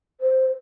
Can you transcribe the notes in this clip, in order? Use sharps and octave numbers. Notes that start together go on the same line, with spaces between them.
C5